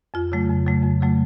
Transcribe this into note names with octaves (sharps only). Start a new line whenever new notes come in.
F2 F4
C#3 F#3 A3
F2
C#3 F#3 A3
F2
C#3 F#3 A3